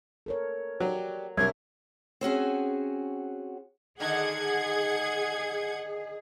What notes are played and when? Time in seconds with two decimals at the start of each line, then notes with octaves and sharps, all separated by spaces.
0.26 A4 A#4 C#5
0.80 F#3 G4 D5
1.37 C2 F#3 D4 A#4 C#5 E5 G#6
2.21 C4 C#4 F#4 G#4
4.00 D3 D#3 D#4 G#4 F#5 G#6